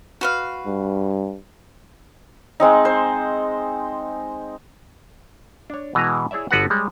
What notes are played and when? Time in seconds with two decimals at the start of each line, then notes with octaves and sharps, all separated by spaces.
0.21 F#4 B4 F5
0.66 G2
2.60 G#3 C4 D#4
2.85 C5
5.70 D4 C#5
5.95 B2 E3 G#3 G#5 A#5
6.31 E4 G#4 C#5 D5 E5
6.51 G1 D3 B3 F#4 B4 F#5
6.70 G3 G#3 C#5